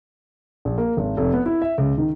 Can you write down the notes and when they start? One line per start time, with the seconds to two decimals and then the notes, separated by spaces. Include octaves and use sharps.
0.65 A#1
0.78 A#3
0.97 G#1
1.17 F1
1.33 B3
1.46 E4
1.62 E5
1.78 C#2
1.98 D#3